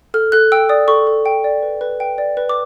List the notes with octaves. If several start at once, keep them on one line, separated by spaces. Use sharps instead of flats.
A4 F6
A4 F#6
G5 E6
D5 D#6
A4 C#6
A4
G5
D5
B4
B4
G5
D5
B4
D6